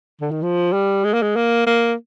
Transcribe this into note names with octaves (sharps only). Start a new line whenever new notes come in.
D3
D#3
F3
G3
G#3
A#3
G#3
A#3
A#3